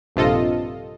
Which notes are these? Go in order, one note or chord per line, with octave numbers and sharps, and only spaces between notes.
A#1 G2 C3 F4 A4 D#5